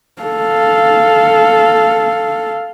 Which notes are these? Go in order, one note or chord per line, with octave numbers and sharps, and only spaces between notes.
A4 F5